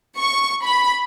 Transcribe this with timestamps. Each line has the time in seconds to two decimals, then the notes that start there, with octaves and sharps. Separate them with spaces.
0.19 C#6
0.66 B5